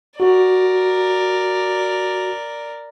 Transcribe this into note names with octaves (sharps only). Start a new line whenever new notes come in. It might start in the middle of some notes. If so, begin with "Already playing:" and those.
F#4 A#4 D5